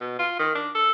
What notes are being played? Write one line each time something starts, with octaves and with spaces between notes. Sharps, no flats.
B2
F4
D#3
D4
A4